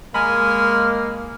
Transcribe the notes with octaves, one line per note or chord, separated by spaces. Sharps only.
G#3 A#3 G#5 A#5 B5 F6